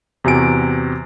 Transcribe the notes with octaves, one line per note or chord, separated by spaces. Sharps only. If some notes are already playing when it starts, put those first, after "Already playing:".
E2 C3 F#4 G#5 D7